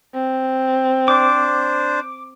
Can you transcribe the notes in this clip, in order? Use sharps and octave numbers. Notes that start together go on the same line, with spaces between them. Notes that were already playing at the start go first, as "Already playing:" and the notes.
C4
D4 C5 D6